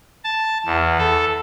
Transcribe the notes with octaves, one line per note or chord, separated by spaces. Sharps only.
A5
E2
A4